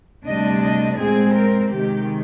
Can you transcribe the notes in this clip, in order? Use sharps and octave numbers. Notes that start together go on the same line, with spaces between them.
D2 C3 G3 D4 D#5
D#5
A#2 G#3 C4 G#4
A#4
C3 D#3 G#3 G4